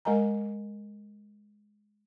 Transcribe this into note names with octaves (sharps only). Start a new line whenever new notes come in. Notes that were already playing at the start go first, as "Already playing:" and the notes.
G#3 A#4 D#5 G#5 A#5